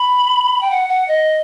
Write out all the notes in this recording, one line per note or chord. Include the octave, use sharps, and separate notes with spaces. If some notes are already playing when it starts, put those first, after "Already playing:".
Already playing: B5
G5
F#5
F#5
D#5